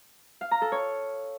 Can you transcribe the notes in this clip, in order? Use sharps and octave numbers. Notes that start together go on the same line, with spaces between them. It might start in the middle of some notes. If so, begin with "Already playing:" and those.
F5
A#5
A4
C#5